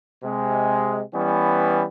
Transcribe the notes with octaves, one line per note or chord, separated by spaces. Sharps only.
C3 G#3
E3 G3 B3 C#4